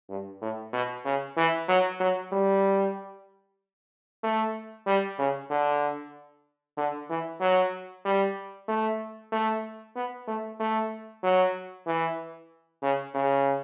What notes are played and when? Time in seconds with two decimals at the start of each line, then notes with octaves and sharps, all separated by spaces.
0.10 G2
0.42 A2
0.73 B2
1.06 C#3
1.37 E3
1.69 F#3
2.00 F#3
2.32 G3
4.24 A3
4.87 G3
5.19 C#3
5.51 D3
6.77 D3
7.10 E3
7.41 F#3
8.05 G3
8.68 A3
9.33 A3
9.96 B3
10.28 A3
10.60 A3
11.24 F#3
11.87 E3
12.82 C#3
13.14 C#3